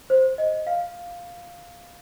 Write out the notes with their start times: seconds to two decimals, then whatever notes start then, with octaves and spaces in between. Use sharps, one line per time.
0.10 C5
0.38 D#5
0.67 F5